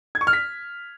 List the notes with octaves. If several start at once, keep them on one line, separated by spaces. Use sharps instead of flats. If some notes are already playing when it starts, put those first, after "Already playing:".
G#6
C#6
F6
B6